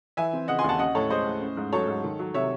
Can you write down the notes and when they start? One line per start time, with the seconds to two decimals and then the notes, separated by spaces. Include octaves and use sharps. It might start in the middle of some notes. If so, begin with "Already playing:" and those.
0.17 E3 E5 G#5
0.33 C4
0.48 C#3 D#5 F#5
0.59 G#5 C6
0.64 D#2 F#5 A5
0.79 C#4 D#5 F#5
0.95 A2 A4 C#5
1.10 G#3 C5 D#5
1.26 A2
1.41 C#4
1.57 G#2
1.73 F#3 A4 C#5
1.88 G#2
2.04 D#3
2.19 F#3
2.34 C3 C#5 E5